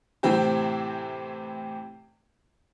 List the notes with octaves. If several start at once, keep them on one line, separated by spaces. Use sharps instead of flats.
A2 C3 E3 C4 G4